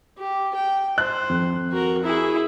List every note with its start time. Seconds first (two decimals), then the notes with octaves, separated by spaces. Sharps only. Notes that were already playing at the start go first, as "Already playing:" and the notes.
0.18 G4
0.55 G5
0.98 C5 F#6
1.29 F2
1.72 F#4 A#4
2.03 E4 G#4